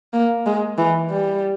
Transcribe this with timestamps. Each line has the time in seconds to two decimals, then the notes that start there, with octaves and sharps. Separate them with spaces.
0.13 A#3
0.46 G#3
0.78 E3
1.10 G3